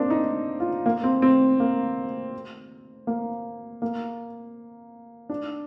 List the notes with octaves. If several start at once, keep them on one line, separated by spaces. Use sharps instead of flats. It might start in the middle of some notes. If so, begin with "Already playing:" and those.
Already playing: A#3 C4 D4
D#4
F4
A#3
C4
C4
A#3
A#3
A#3
D4